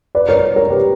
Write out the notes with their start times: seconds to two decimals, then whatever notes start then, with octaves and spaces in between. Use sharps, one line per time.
0.15 B4 D5
0.29 A#4 C#5
0.56 A#4 C#5
0.70 G4 B4